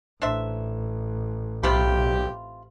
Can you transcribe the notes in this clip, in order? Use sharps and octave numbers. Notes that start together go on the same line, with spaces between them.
A1 D4 C5 E5
B1 C3 F4 G4 B5